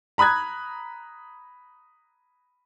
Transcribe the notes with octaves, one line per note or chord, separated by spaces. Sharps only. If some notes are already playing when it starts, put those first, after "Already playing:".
A#5 B5 D#6 F#6 G#6